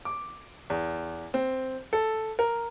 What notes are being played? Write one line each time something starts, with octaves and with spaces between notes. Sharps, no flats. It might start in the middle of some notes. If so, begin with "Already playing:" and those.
D6
E2
C4
A4
A#4